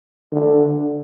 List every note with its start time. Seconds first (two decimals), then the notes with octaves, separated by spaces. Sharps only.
0.32 D3